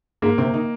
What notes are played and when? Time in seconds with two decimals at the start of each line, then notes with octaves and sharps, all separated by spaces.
0.22 G#2 G#3 A#3
0.38 C3 C4
0.54 D#3 D#4